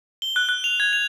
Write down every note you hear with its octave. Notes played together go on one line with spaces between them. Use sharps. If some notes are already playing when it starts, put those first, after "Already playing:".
G7
F#6
F#6
F7
G#6
F7